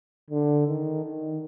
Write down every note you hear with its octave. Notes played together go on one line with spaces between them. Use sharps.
D3
D#3
D#3